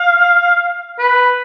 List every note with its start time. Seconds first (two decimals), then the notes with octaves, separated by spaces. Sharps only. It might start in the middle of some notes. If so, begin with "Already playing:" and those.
Already playing: F5
0.99 B4